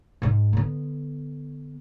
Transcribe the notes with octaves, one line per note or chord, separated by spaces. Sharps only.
G#2 G#3
D3 B3